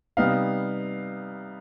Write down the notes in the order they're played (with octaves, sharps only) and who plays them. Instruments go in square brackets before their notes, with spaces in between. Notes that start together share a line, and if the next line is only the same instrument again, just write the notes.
[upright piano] C3 G3 B3 D#4 F5